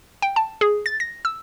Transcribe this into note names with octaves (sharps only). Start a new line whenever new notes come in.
G5
A5
G#4
A6
A#6
E6